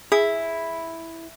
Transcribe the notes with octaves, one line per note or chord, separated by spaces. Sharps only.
E4 G#4